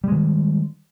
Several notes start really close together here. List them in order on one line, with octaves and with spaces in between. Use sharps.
G3 G#3 D#3